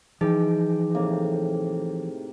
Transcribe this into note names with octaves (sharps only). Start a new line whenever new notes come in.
E3 F3 D#4 G#4 D#5 G5
A2 C3 A#3